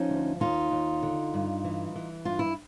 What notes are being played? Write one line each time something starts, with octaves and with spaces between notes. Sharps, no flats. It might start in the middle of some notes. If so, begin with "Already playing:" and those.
Already playing: F3 C#4 D#4
D2
D#2 D#4 F4
D#2
D3
G2
E3
E3
G2 F4
E4